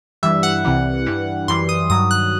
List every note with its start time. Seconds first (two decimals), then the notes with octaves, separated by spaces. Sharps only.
0.23 G2 E3 G3 E5
0.43 F#5
0.65 C2 C3 E3 G3
1.06 G2 E3 G3
1.48 F#2 E3 G3 C6
1.69 D#6
1.90 G2 D#3 F#3 D#6
2.11 F#6